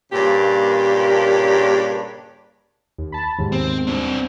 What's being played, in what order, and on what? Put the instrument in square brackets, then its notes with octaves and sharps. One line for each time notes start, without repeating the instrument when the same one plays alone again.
[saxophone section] G2 A#2 C#3 A#3 D4 G4
[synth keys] D#2
A5 B5
D#2 G#2
[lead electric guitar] C4
C4 D4